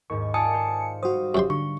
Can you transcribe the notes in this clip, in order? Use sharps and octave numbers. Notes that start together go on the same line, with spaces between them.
D#2 G#2 C#6
F4 D5 F5 G#5 A5 D#6 C#7
C5 F5
G3 F#4 C5 F5 D#6
F#2 G4 C6
D3 C#6